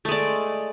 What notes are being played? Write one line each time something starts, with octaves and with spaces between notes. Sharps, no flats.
G#3 A3 D5